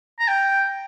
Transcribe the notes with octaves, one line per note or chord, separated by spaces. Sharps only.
A#5
G5